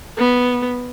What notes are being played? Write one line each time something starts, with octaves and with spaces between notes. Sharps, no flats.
B3